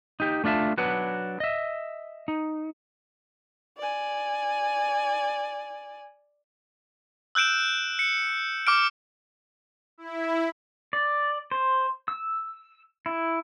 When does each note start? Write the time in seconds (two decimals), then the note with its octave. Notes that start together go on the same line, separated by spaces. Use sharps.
0.20 D#4 G4
0.44 A3 D4 F4 E5 A5
0.78 F#3 D4 B4 F#5
1.40 D#5 E5
2.28 D#4
3.78 D5 G#5
7.35 E6 F#6 G6 D7 E7
7.99 C#7
8.67 D6 F6 D7
9.98 E4
10.93 D5
11.51 C5
12.08 E6
13.06 E4